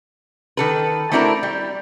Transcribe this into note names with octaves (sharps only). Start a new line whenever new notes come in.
D#3 A4 B4
A3 C4 D4 E4 F#4 A#4
G3